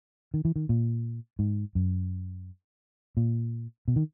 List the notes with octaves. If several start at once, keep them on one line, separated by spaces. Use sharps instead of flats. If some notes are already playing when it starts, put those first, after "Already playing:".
D#3
E3
D#3
A#2
G#2
F#2
A#2
B2
D#3